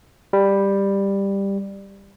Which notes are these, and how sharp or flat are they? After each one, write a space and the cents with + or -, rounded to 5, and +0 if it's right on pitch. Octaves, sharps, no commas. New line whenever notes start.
G3 +10